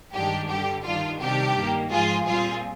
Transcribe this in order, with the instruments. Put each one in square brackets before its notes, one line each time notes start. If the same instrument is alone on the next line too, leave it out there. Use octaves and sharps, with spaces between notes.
[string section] G2 D#3 G#3 D4 G4
G2 D3 G3 G4
G2 D#3 G3 D4 F4
C3 D#3 G3 D4 G4
G2 D#3 A#3
G#2 F3 G#3 F4 G#4
A#2 G3 C4 F4 G#4